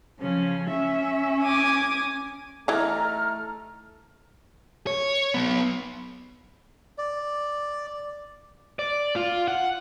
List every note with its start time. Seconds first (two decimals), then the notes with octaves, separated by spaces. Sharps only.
0.20 C#3 F3 C#4
0.69 C#4 E5
1.43 G#5 D6 D#6
2.68 E3 A3 D#4 A#5 F6
4.87 C#5
5.34 F#3 B3
6.98 D5
8.79 D5
9.16 F4
9.48 F#5